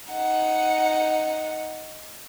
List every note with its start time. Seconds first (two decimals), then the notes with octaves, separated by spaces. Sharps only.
0.11 D#4 F#5